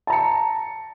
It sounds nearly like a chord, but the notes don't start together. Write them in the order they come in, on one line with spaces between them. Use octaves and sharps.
A5 A#5 C#7